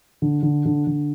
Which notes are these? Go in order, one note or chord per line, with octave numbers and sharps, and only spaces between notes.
D3
D3
D3
D3